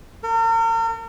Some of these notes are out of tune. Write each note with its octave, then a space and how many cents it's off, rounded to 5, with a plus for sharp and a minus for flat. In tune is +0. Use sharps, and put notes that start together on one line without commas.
A#4 -40